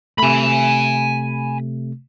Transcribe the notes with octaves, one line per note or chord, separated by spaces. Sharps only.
C3 A3 G#5 B5